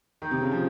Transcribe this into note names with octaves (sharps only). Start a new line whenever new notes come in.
D#3
C3
C#3
F3